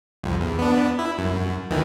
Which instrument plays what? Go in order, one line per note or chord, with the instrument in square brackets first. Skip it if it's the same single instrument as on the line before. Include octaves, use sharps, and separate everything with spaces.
[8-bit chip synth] C2 F2
E2
B3 D4
E4
F#2
D2 D#3 E3